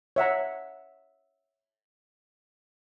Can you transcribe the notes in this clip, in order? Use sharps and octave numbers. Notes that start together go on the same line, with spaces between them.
C#5 E5 F#5 A#5